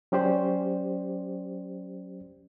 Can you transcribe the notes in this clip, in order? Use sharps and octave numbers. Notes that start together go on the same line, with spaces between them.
F#3 C#4 G4 C5 D5